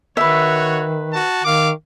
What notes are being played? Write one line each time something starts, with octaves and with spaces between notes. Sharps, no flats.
D#3 F#4 B4 C#5 E5
F#4 A5
D#3 F5 D6